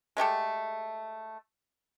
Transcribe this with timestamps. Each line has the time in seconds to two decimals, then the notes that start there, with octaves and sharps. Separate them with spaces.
0.17 G#3 A3 G4 A4